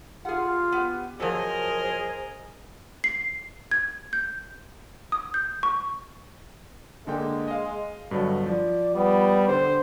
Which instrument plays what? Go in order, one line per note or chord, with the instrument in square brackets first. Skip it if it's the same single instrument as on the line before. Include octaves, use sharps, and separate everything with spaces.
[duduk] F4 [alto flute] G4 [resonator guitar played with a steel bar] G#4 F#5
[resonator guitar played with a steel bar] B3
[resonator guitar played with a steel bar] F3 F#3 [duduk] G#4 [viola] A#4 D#5 [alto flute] C5
[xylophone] C7
G#6
G6
D#6
G6
C#6
[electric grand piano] D3 A#3 G5 [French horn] G#3
[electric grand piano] D#5 F5
[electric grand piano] G2 D3 F#3 [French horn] B2
[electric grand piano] F3 [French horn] D5
[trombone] G3 [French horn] B3
[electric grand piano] D3 [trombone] C5